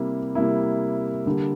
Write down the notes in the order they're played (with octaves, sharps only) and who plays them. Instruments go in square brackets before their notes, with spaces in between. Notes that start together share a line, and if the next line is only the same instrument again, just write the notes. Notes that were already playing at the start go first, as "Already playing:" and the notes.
Already playing: [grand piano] C3 G3 A#3 E4
C3 G3 A#3 E4
D3 G3 A#3